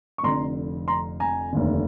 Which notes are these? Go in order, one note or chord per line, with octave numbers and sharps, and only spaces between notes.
C#6
F1 F2 D3 A#5 C6
A#5 C6
G#5 A#5
F1 D#2 D3